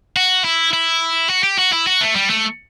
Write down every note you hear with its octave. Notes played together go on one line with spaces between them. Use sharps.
F#4
E4
E4
F#4
G4
F#4
E4
F#4
A3
G3
A3